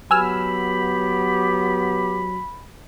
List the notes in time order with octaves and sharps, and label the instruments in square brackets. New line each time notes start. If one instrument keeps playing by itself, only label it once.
[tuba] F#3 [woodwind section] B3 G4 [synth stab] G#5 E6 F6 [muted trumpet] B5